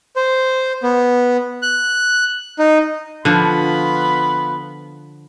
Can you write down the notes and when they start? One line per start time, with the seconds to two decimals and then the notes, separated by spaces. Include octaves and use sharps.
0.16 C5
0.83 B3
1.62 F#6
2.59 D#4
3.25 D3 F3 B3 F4 B5